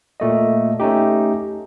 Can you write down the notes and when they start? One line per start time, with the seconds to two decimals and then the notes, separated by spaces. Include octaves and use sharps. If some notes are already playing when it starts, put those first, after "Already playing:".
0.20 A#2 A3 D#5
0.80 A3 C#4 D#4 G4